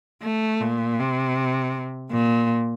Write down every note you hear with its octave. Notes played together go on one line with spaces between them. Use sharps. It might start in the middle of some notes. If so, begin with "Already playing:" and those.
A3
A#2
C3
A#2